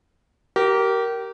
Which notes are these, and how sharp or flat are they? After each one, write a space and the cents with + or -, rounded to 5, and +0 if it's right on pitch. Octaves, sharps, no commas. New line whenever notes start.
G4 -25 A#4 +0